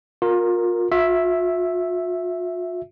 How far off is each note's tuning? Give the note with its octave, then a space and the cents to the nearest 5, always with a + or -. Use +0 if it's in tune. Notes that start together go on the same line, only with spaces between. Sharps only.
F4 +30 A#4 +0
F4 +45 E5 +0